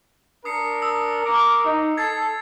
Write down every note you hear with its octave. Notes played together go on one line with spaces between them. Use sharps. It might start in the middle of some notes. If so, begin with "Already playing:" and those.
D4 A#4 D#6 C7 C#7
D#6 E6
A#4 D6
D#4
A4 G#6 A6 C7